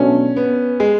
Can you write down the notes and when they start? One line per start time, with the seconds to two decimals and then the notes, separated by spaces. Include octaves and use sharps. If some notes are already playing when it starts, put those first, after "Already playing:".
Already playing: B2 F#3 A3 C#4 D4
0.37 B3
0.80 G#3